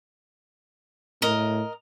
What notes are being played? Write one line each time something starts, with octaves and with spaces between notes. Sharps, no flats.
A2 A#4 D#5